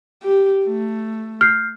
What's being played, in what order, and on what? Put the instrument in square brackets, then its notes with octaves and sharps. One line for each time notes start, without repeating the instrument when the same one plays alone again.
[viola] G4
A3
[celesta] F6 G6 C7